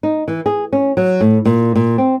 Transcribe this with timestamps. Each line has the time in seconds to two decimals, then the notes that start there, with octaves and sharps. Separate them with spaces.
0.03 D#4
0.28 E3
0.46 G#4
0.73 C#4
0.97 F#3
1.21 A2
1.46 A#2
1.76 A#2
1.98 C4